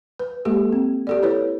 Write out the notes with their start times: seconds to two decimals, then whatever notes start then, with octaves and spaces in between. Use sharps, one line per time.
0.19 B4
0.45 G#3 A#3 G4 A4
0.72 C4
1.07 G4 A4 D5
1.23 E4 B4 C#5